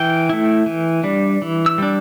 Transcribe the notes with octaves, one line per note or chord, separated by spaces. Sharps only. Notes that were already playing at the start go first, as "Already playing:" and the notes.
Already playing: E3 G5
A3 E4
E3
G3 D4
E3
E6
G3 D4